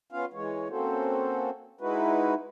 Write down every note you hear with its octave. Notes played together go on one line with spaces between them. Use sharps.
B3 C#4 F4 F5
E3 G#3 C#5
A#3 C4 C#4 F#4 A4 C5
G#3 D#4 E4 F#4 B4